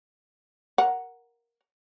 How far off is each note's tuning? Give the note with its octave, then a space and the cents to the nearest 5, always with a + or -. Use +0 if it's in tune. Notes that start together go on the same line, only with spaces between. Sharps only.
A#4 +10 F#5 +0